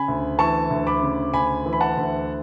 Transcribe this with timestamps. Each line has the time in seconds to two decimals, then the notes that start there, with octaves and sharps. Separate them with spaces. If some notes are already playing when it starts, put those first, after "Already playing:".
Already playing: C#3 G#5 B5
0.08 D2
0.39 E3 A5 C#6
0.71 D2
0.87 B5 D6
1.03 C#3
1.33 D2 G#5 B5
1.66 E3
1.73 B5
1.81 F#5 A5
1.97 D2